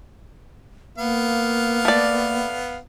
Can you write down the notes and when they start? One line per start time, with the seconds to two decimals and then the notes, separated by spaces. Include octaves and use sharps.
0.98 A#3 B3 F5
1.85 A3 D5